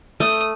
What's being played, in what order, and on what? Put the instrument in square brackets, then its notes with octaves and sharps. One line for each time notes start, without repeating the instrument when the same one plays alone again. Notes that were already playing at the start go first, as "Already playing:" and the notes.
[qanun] A3 [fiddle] D#6